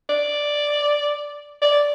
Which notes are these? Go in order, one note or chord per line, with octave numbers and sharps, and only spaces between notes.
D5
D5